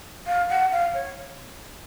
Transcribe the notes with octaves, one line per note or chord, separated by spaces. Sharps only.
F5
F#5
F5
C#5